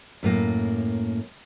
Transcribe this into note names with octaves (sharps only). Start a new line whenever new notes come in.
F#2 A2 A#3